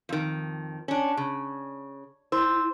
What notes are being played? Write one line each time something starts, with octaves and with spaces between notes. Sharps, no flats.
F2 D#3
C#4 D4
C#3
E4 C5